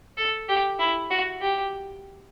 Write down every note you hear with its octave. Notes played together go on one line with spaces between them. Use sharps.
A4
G4
E4
F#4
G4